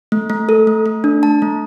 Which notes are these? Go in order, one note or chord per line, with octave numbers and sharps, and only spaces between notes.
A3
A3
A4
A3
A3
D4
A5
A3